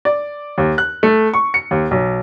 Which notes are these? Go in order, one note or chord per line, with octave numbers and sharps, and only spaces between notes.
D5
D#2
F#6
A3
C#6
C#7
D#2
B1